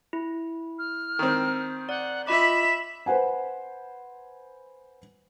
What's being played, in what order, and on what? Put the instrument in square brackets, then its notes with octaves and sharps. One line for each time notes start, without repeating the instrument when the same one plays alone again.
[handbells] E4
[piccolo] F6
[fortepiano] D#3 C4
[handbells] D5 [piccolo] F#5
[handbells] F4 D#5 D6 [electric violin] E5 B5 [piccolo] E7
[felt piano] B4 C5 F#5 G#5